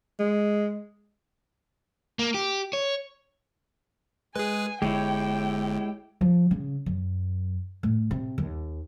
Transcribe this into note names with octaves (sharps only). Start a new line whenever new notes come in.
G#3
A#3
G4
C#5
G#3 G#4 B4 G#5
G1 G#3 E4 G4 C#5 G5
F3
C#3
F#2
A2
C3
D#2